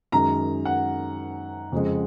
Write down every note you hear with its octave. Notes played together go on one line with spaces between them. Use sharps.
F#2 D#3 G#3 A#5
F#5
F2 C#3 G#3